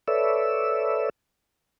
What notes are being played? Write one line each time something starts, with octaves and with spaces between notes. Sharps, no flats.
A4 B4 C#5 D5 E5 E6